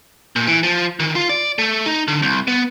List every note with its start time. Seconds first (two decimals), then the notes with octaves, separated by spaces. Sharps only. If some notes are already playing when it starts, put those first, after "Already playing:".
0.36 A#2
0.48 E3
0.63 F3
1.00 D#3
1.15 F4
1.29 D5
1.59 A3
1.86 D#4
2.08 D3
2.22 C2
2.48 B3